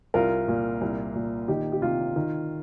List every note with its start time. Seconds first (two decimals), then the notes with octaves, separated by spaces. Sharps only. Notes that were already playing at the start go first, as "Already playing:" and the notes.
0.14 C2 F4 A#4
0.48 A#2
0.81 C2
1.15 A#2
1.48 D#3 D#4 G4
1.72 G4
1.82 C3 F4
2.16 D#3